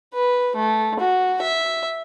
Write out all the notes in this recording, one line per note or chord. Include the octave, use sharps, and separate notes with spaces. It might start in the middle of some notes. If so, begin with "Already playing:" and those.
B4
A3
F#4
E5